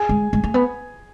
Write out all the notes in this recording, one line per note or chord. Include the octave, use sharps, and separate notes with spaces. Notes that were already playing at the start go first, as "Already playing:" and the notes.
Already playing: G#4 G#5
G#3
G#3
A3
B3